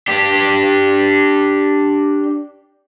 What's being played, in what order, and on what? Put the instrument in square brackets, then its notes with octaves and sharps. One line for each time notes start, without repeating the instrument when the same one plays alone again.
[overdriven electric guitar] D4 G4